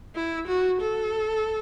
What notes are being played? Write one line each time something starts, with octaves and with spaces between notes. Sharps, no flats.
E4
F#4
A4